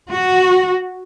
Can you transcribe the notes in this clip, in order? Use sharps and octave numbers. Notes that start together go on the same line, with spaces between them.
F#4